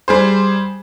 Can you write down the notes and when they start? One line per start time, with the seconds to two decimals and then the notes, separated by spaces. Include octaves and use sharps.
0.08 G3 G#4 C5